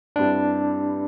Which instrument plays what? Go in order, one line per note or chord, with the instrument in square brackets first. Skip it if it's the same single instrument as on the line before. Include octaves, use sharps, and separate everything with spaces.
[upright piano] G2 G3 C4 E4 G4 [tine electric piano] D4